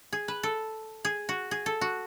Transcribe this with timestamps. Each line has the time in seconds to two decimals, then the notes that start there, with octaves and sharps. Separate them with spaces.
0.13 G#4
0.28 B4
0.43 A4
1.05 G#4
1.29 F#4
1.51 G#4
1.66 A4
1.81 F#4